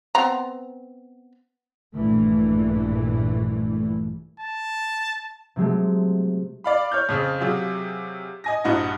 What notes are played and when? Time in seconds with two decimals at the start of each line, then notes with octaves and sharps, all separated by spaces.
0.15 B3 C4 A#5
1.95 A#1 G2 A#2 E3 A3
4.40 A5
5.56 C3 F#3 G#3 A3
6.64 D5 F5 B5
6.92 C#5 F6 G6
7.09 F2 C#3 C4
7.40 C3 F#3 F4 G#4
8.44 D#5 G#5 A#6
8.64 A#1 G2 D#4 F#4 F#5